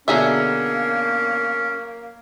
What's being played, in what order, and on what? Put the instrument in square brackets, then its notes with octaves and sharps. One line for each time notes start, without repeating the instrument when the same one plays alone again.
[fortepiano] B2 D3 [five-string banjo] F#3 G#4 E5 [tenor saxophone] A#3 [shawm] C#4